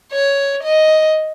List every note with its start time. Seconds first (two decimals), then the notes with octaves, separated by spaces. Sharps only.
0.12 C#5
0.63 D#5